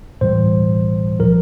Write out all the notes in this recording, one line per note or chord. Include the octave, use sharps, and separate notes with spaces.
A2 E3 G3 C5
A#2 F3 A#4